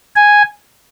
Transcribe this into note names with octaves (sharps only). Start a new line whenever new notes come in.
G#5